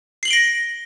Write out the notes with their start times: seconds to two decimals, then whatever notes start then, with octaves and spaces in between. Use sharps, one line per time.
0.23 C7
0.25 F#7
0.28 G7
0.30 D7
0.33 A#6